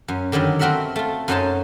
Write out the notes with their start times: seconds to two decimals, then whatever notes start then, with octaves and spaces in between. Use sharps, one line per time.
0.08 F#2 C#4
0.32 D3 D#3 F#3 G3
0.59 A3 C4 F#4 A#4 E5 F#5
0.96 A3 F4
1.28 F#2 F#3 C#4 D#4 C5 A5